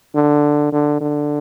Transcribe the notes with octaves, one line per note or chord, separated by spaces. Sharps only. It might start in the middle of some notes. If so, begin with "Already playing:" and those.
D3
D3
D3